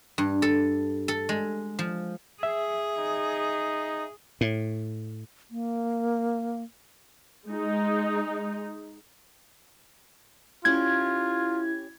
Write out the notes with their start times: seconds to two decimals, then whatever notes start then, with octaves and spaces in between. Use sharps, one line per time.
0.18 G2
0.42 A4
1.08 A4
1.29 G#3
1.79 F3
2.43 G#4 E5
2.98 D#4
4.41 A2
5.51 A#3
7.47 G#3 D#4
10.65 C#4 E4 F4 G4 G#6